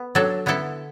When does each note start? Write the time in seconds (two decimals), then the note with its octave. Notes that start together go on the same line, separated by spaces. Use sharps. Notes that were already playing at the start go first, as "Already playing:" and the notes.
Already playing: B3
0.15 F#3 D4 A4
0.46 D3 B3 E4 A4